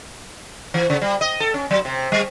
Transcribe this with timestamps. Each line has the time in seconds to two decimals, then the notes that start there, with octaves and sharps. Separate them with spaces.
0.74 E3
0.90 C#3
1.02 G3
1.21 D#5
1.40 A4
1.54 C#4
1.71 F#3
1.85 C3
2.12 G3